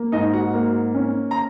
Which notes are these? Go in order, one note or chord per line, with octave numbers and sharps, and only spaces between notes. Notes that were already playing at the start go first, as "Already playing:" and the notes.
Already playing: A#3
G#2 D#4 D#5
F#4 F#5
A#3
C#4
A#5